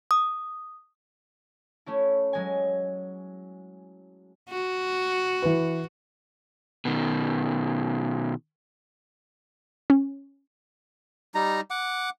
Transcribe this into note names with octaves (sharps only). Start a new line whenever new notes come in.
D#6
A3 C#4 E4
F#3 G#3 G#5
F#4
E3 B4
B2 D#3
C#4
G3 D#4 A#5
F#5 D6